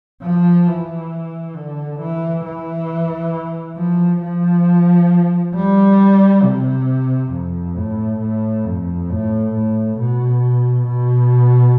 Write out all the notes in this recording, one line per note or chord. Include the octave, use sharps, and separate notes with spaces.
F3
E3
D3
E3
E3
F3
F3
G3
C3
F2
A2
A2
F2
A2
A2
B2
B2